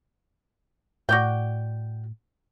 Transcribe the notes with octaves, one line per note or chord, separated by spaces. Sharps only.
A2 F#4 D5 G5